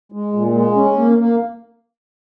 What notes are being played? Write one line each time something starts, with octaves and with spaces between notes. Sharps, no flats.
G#3
A#2
G#3
C#4
A#3
A#3